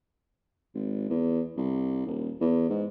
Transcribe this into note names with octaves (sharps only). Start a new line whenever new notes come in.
G#1
E2
C2
D#1
E2
G#2